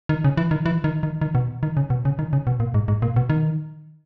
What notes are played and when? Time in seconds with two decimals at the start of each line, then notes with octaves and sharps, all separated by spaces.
0.09 D#3
0.24 C#3
0.37 E3
0.51 D#3
0.66 E3
0.84 D#3
1.03 D#3
1.21 D#3
1.35 B2
1.63 D#3
1.77 C#3
1.90 B2
2.05 C#3
2.19 D#3
2.33 C#3
2.47 B2
2.60 A#2
2.74 G#2
2.88 G#2
3.02 A#2
3.16 B2
3.30 D#3